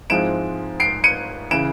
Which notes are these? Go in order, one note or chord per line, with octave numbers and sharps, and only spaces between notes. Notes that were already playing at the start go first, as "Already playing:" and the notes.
G#2 F3 G#3 C4 E4 D7 E7
C7 D7
C#7 D#7
C#3 E3 D7 E7